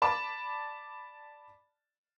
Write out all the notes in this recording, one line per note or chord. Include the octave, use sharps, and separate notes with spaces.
D5 A5 B5 D6